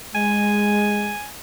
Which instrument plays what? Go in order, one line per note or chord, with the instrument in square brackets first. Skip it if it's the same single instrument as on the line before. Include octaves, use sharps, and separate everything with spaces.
[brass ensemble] G#3 [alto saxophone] G#5